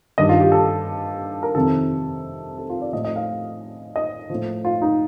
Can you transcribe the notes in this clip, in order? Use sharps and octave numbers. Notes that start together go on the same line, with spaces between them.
G2 D#3 D#5
F4
G4
A4
A#4
F2 C3 D#3 A4
A4
F4
D5
A2 F3 D#5
D#5
F5
D#5
A2 F3
F4
D#4